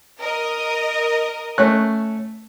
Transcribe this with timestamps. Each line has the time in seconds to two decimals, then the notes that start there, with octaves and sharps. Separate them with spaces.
0.19 A#4 D#5
1.58 A3 C#4 F#6